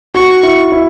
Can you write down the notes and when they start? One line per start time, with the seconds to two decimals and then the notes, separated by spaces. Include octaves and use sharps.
0.14 F#4 C#6
0.43 E4
0.72 E4